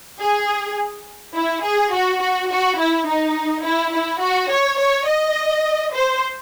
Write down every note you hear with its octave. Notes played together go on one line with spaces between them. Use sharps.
G#4
E4
G#4
F#4
F#4
F#4
E4
D#4
E4
E4
F#4
C#5
C#5
D#5
C5